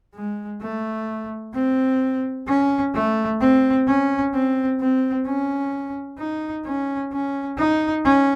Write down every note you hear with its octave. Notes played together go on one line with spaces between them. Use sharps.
G#3
A3
C4
C#4
A3
C4
C#4
C4
C4
C#4
D#4
C#4
C#4
D#4
C#4